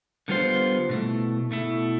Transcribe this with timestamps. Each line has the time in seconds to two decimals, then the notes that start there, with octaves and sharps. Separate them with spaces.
0.28 D3 G3 B3 F4 C5
0.89 B2 A3 E4
1.51 B2 A3 E4